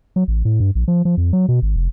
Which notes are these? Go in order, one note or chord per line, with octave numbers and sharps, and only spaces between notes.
F#3
A1
A2
G2
A#1
F3
F3
F2
F#3
B2
G#1
F1